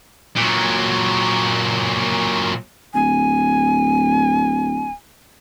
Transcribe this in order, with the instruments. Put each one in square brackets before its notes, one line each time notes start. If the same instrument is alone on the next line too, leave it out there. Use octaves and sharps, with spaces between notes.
[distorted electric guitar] A#2 F#3
[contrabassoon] D1 [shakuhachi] G#5